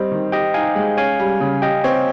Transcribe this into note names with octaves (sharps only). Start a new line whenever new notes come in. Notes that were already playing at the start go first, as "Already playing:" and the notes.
Already playing: G3 C4 C5 D#5
D#3
G4 D#5 G5
D#4 F5 G#5
G#3
C#4 F5 G#5
G3
C#3
G4 D#5 G5
C4 C#5